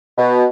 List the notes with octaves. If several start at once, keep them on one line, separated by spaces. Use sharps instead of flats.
B2